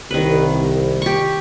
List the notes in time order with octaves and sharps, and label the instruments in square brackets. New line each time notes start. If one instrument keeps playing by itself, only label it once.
[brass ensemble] C2 [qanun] D#3 B4
[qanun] G4 C#6